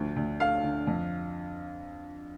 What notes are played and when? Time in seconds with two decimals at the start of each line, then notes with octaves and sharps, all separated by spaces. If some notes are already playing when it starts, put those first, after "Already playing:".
Already playing: D2 D3 F3
0.16 D2
0.40 A3 F5
0.63 D3
0.87 F2